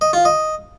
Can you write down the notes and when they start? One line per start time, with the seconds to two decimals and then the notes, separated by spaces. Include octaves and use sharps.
0.01 D#5
0.13 F4
0.25 D#5